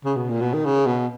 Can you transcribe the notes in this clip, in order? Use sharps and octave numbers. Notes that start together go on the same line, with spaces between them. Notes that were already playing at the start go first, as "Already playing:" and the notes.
C#3
B2
A#2
B2
D#3
C#3
B2